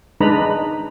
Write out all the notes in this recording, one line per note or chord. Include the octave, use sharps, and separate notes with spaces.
G#3 D4 D#4 B4 A#5 B5